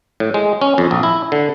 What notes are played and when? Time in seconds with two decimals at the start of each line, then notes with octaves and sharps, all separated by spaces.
0.20 A2
0.34 G#3
0.61 C#4
0.78 F2
0.91 A#1
1.03 E4
1.32 D3